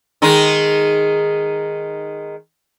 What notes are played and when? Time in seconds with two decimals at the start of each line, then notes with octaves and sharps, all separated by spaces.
0.22 D#3 G#3 D#4